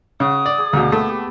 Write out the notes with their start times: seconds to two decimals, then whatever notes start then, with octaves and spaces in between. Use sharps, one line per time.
0.20 C#3 F#4 D#6
0.46 D5
0.58 G#4 D6
0.73 D2 B2 A#3
0.92 A3 B3
1.04 B3 G4